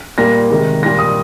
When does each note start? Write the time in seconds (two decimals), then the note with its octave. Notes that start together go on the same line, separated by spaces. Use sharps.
0.18 A#2 G3 A#3 A#6
0.50 C3 D#3 G#3
0.83 A#2 G3 A#3 A#6
0.99 D#6